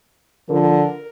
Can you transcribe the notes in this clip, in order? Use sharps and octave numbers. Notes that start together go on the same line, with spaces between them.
D3 F3 A#4